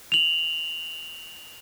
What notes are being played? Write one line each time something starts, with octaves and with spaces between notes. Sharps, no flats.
F7 F#7